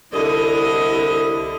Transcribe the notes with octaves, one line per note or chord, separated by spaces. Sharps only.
C2 D3 E4 D#5